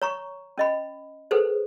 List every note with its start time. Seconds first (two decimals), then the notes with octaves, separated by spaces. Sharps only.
0.02 C#5 A#5 C#6
0.58 C#4 D#5 B5
1.31 G#4 A4 B4 C5